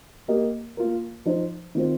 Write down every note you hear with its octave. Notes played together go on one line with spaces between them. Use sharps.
A#3 G4 D#5
A#3 F4 A#4
F3 D#4 C5
D#3 C4 F4 C5